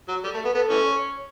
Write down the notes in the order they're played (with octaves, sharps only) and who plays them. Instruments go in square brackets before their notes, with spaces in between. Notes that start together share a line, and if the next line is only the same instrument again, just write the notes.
[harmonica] F#3
[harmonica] G3 [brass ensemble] A4
[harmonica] A3
B3
[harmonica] B3 [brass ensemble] A4
[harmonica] E3 A3 C#4
[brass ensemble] C#5